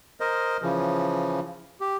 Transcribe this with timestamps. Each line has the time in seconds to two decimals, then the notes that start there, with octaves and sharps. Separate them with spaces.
0.20 A#4 C5 D#5
0.62 C#3 E3 F3
1.80 G4